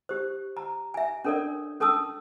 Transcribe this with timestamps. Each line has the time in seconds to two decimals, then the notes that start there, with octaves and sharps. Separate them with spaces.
0.09 G4 C5
0.57 A#5
0.94 E5 G#5
1.25 C#4 D4 A4 A#4 C#5 D5
1.80 C#4 A4 A5 D#6 E6